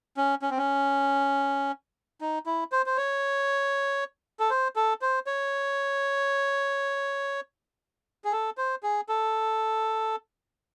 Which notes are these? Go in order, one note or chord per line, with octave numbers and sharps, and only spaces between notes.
C#4
C#4
C4
C#4
D#4
E4
C5
C5
C#5
A4
C5
A4
C5
C#5
G#4
A4
C5
G#4
A4